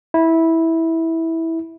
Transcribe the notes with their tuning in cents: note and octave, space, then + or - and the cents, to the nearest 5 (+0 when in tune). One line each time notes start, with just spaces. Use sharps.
E4 -15